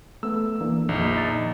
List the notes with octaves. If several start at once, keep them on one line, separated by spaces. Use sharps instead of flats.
A3 B3 A4 E6
E3 A#3 D4
A#1 F2 D#3 D#4
D#5 A6